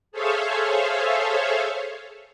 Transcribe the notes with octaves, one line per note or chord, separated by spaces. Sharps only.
G#4 A4 C5 C#5 E5 F5